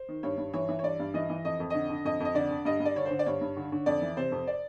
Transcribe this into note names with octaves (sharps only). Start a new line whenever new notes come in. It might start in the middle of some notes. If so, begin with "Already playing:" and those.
Already playing: C5
D#3
G2 C#5
G2
E3 C#5
E3
C#5
G2 D5
G2
E3 D#5
E3
F2 D#5
F2
D3 D#5
D3
F2 D#5
F2 D#5
D3 D5
D3
G2 D#5
G2
D5
D3 C#5
D3 C5
D5
G2 C#5
G2
D3
D3
F2 D5
E3
C3 C5
F2
D5